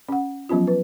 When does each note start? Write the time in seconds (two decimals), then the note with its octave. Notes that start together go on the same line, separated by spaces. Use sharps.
0.09 C#4 F#5
0.49 F3 F#3 B3 C#4 F4
0.67 B4